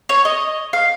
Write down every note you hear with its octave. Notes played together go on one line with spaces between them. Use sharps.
C#5
D#5
F5